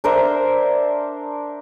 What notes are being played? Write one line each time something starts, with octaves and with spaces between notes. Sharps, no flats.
D4 A#4 C5 E5